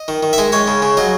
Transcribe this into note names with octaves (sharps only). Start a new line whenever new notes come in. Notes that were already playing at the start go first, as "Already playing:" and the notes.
Already playing: D#5
D#3
D#3
E5
G#3 D#5
G#3 C#5
C#3
C#3
F#3 D#5